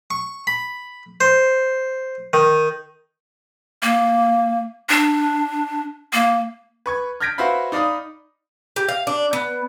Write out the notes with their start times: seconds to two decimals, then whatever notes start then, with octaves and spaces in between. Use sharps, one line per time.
0.11 C#6
0.47 B5
1.21 C5
2.33 D#3
3.83 A#3
4.89 D4
6.13 A#3
6.86 B4 C#6 G#6
7.20 F6 G6 G#6 A#6 B6 D7
7.38 F#4 B4 C5 E5 F5 B5
7.72 D#4 D5 F5 B5 D#6
8.76 G4
8.89 F5
9.07 D4
9.33 B3